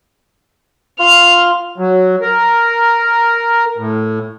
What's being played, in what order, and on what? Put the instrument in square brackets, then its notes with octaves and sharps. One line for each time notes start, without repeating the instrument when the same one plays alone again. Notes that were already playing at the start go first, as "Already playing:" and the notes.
[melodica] F4 F5 C6 [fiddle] F6
[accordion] F#3
A#4
A2